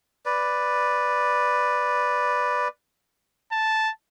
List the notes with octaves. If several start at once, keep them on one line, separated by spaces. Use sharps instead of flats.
B4 D5
A5